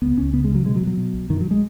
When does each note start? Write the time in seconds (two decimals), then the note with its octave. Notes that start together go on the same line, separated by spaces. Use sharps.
0.02 C#2 B3
0.17 C#2 C#4
0.33 C#3 B3
0.44 G#3
0.49 C#3
0.55 F#3
0.66 B2 G#3
0.76 F#3
0.81 B2
0.87 F#3
0.97 B2
1.14 B1
1.30 F#2 D#3
1.41 F#3
1.51 G#3